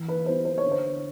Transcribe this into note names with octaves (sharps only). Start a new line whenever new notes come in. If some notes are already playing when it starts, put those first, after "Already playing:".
Already playing: E3
B4
G3 B3 E4 C5
C5
C#5
D3
C5